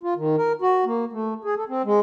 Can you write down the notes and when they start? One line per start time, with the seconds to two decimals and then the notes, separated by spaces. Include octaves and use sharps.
0.03 F4
0.16 D#3
0.37 A#4
0.61 F#4
0.86 A#3
1.13 A3
1.44 G#4
1.57 A4
1.69 C4
1.85 G#3